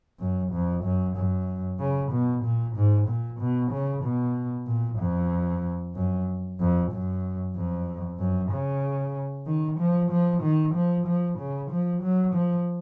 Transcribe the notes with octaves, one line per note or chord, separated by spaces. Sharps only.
F#2
F2
F#2
F#2
C#3
B2
A#2
G#2
A#2
B2
C#3
B2
A#2
F2
F#2
F2
F#2
F2
F#2
C#3
D#3
F3
F3
D#3
F3
F3
C#3
F3
F#3
F3